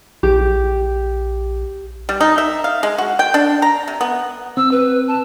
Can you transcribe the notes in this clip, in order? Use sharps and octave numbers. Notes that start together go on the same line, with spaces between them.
A#1 G4
G3
D#4
E5
F5
G#3
F#4
G5
D4
A#5
C3
B3
C4 E6
B4
A5